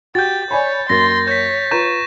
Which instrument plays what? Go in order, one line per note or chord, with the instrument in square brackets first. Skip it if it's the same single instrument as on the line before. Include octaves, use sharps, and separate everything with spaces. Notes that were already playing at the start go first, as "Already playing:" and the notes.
[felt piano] F#4 [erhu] G4 [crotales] G6 A6
[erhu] C#5 [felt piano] D5 G#5 B5
[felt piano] F#2 A#3 [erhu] C6 [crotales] A6 A#6
[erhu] C#5 [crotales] G6 B6
[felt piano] F4 B4 A#5 [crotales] C#6 G6 E7